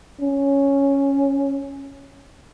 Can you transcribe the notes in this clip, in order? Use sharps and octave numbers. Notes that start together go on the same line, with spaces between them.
C#4